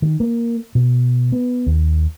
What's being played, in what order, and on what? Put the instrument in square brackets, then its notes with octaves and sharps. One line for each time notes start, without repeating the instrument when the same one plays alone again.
[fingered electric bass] D#3
A#3
B2
B3
D#2